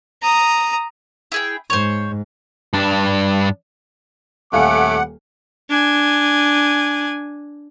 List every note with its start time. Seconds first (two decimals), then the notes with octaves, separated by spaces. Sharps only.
0.22 A#5 D#6
1.32 E4 G#4 G5
1.70 G#2 C5 C#5
2.73 G2 D4
4.53 D#1 A3 C#5 F5 F#5 G#5 B5 D6
5.69 D4 G#5